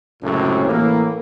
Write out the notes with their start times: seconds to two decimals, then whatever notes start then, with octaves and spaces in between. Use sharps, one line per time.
0.22 C#2 F#2 A2 C3
0.65 A2 E3 A#3